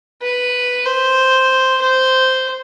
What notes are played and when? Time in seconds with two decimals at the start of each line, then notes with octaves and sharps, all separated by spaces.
0.22 B4
0.85 C5
1.81 C5